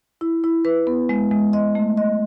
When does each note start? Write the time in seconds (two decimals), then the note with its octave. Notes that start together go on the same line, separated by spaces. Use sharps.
0.21 E4
0.44 E4
0.65 B4
0.87 B3
1.09 G#3
1.31 G#3
1.53 D#5
1.75 A3
1.97 D#5